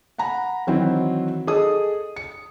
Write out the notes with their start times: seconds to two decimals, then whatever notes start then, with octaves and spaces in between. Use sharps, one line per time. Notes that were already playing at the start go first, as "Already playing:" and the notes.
0.18 F#5 G#5 A#5 B5
0.67 D#3 E3 F#3 C4 E4 C5
1.47 G#4 A4 D#5 D#6
2.16 C#7